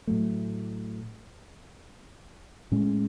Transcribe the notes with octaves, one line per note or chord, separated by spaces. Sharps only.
A2 F#3 A3
A2 G#3 C#4